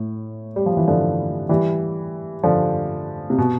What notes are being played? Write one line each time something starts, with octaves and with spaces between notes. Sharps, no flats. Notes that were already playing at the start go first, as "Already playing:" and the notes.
Already playing: A2
G3
F3
E3
D3 F3
E3 G3
D3 F3
C3
B2